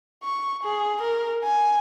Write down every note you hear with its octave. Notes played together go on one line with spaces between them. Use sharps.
C#6
G#4
A#4
G#5